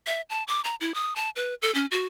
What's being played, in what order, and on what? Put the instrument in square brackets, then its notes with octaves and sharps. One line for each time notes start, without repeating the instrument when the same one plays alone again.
[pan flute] E5
A5
D6
A#5
E4
D#6
A5
B4
A4
C#4
F#4